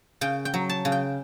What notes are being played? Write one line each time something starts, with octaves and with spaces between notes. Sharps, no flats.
C#3 G5
G5
F#3
A5
C#3
G5